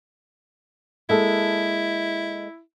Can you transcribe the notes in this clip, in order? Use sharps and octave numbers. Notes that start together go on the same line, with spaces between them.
G#3 A#3 E4 A4